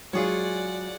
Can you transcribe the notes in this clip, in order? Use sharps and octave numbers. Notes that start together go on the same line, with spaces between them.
F#3 G#3 F4 G#4 C#5 D5 F#5